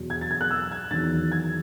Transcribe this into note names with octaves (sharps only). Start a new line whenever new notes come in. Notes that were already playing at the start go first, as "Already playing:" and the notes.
Already playing: E2 B2 F#3
G#6
A6
G#6
F#6
E6
G#6
E2 D#3 F#3 A6
G#6